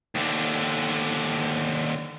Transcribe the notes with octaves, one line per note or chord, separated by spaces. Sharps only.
D#2 D3